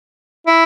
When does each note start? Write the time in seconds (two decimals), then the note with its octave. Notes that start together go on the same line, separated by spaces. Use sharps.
0.47 E4